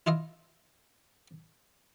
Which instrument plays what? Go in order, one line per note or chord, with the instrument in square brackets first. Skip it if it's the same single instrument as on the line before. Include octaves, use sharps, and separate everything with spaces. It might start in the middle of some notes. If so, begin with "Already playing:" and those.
[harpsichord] E4 F4 D#5 F5